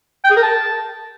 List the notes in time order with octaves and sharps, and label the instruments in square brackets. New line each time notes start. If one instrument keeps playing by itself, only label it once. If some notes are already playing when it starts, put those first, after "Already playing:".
[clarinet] G5
G#4
A#4
A5